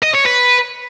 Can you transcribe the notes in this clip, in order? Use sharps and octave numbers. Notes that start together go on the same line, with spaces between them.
D#5
C#5
B4